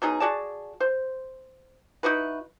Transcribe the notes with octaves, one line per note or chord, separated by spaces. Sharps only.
B2 F#3 D#4 G#4
F#4 G#4 D5 A5
C5
D#4 E4 F#4 B4